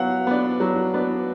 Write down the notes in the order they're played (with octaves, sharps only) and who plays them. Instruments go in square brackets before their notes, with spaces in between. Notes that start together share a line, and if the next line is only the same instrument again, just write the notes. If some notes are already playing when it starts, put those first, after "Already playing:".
Already playing: [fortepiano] F#3 B3 [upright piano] F5 F#5
[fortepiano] B3 D4
F#3
B3 D4